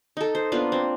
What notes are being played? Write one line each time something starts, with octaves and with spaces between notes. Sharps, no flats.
D#4 A4
C5
A#3 B3 D4 F4
C4